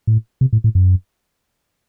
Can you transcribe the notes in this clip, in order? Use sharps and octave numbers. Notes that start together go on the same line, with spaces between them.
A2
C3
A2
A2
F#2